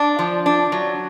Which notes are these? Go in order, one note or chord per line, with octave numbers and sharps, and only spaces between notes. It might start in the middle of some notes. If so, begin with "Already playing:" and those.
Already playing: D4
F3
D4
F#3